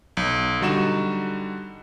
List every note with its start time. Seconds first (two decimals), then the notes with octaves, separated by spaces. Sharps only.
0.17 B1
0.61 D3 G3 D#4 F#4 E7